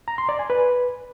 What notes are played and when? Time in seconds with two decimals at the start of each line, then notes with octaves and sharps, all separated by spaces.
0.08 A#5
0.18 C6
0.29 D5
0.39 G#5
0.50 B4